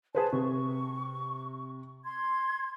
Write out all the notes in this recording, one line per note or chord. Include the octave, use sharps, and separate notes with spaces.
G#4 B4 C5 A5
C3 C#6
C6 G#6